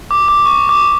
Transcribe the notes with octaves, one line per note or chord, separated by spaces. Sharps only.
D6
D6
C#6
D6